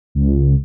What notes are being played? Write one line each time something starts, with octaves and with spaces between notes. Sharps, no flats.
C#2